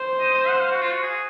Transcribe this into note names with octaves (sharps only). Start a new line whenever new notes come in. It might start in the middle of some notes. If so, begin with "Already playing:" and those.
Already playing: C5
D#5
D#5
F#5
F5
F#4
F4
F#4
G#4